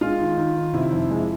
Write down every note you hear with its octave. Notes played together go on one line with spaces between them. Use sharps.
G#3 F4
D#3
D#3
D#3
C3 E4
F2
G#3